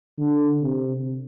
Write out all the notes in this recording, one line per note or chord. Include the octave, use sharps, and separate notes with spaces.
D3
C3